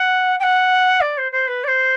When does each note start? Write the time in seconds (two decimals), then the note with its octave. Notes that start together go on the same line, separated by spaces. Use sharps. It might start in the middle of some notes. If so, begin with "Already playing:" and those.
Already playing: F#5
0.39 G5
0.43 F#5
1.00 D5
1.17 C5
1.32 C5
1.47 B4
1.63 D5
1.67 C5